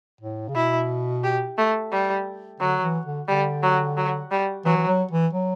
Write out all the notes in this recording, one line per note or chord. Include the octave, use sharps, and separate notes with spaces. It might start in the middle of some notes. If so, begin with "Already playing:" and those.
A2
C#3
B2 E4
G4
A3
G3
D3 F#3
E3
D3
D3 G3
F#3
F#3
G3
E3 F#3
E3
F#3
E3
F#3